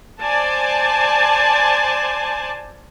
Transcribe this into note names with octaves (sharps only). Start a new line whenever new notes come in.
C5 D5 G#5 A5